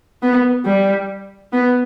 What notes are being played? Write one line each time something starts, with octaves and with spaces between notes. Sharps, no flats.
B3
G3
B3